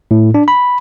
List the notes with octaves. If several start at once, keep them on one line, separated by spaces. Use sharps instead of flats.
A2
D4
B5